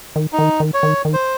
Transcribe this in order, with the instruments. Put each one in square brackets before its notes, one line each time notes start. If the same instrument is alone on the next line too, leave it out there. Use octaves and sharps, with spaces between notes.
[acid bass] D#3
[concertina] D#4
[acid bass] D#3
D#3
[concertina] C#5
[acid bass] D#3
D#3
[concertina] C5